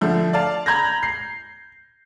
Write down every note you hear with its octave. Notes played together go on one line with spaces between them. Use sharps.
D3 F3 A3
D5 F5 A5
A#5 B5 G6 G#6 A#6
C7